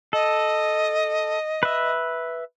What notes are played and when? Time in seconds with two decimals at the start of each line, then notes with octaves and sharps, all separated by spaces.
0.13 A4 D#5
1.63 B4 E5